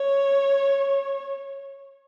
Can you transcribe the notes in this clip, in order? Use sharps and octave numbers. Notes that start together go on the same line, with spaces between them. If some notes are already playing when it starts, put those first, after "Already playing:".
Already playing: C#5